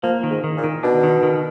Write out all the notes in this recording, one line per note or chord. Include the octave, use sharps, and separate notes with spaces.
F3 A#3
D#3
G#2
D#3
A#2
D#3
B2 D4
D#3
D#3